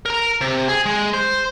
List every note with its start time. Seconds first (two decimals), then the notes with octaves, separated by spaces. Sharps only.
0.06 A#4 A#5
0.41 C3
0.68 G#4
0.86 G#3
1.14 C5